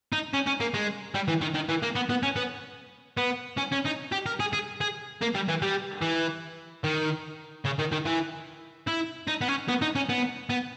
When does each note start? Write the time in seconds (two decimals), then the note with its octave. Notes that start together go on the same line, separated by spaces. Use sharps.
0.12 D#4
0.33 C#4
0.46 C#4
0.60 A#3
0.74 G#3
1.15 G3
1.28 E3
1.41 D#3
1.54 D#3
1.69 E3
1.82 A#3
1.95 B3
2.09 B3
2.23 C#4
2.36 B3
3.17 B3
3.58 C#4
3.72 C#4
3.86 D#4
4.12 G4
4.26 A#4
4.40 G#4
4.53 G#4
4.81 G#4
5.21 A#3
5.35 G3
5.48 E3
5.62 G3
6.02 E3
6.84 D#3
7.65 C#3
7.79 D#3
7.92 D#3
8.06 E3
8.87 E4
9.27 D#4
9.41 B3
9.48 C#4
9.68 B3
9.82 D#4
9.96 C#4
10.09 B3
10.50 B3